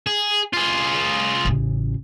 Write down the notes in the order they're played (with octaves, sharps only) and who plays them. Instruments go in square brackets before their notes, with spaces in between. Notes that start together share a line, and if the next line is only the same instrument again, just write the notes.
[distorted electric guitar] G#4
F4 G#4
[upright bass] A1 C#3